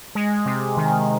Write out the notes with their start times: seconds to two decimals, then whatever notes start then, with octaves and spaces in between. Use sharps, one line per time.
0.15 G#3
0.46 C3
0.77 D#3